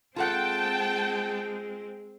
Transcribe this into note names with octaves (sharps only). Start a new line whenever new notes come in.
G#3 C4 F4 A4 F#5 G5 A5